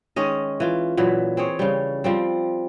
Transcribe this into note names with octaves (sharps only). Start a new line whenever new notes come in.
D#3 G#3 C#4 D#5
E3 F4
A#2 E3 F#3 E4
C4 G#4 C#5
C#3 G3
F3 G3 C4